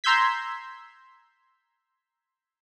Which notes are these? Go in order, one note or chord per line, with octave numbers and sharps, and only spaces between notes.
A#5 C6 E6 G6 G#6 B6